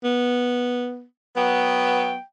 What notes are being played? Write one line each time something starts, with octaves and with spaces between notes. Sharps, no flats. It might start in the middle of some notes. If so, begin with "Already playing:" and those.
B3
F#3 B3 G5